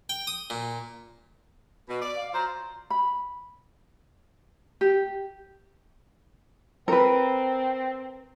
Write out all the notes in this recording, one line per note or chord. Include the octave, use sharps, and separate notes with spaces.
G5
D#6
A#2
B2
D5
F5
F#3 F4 C5 A#5
B5
G4
C4 A#4 B4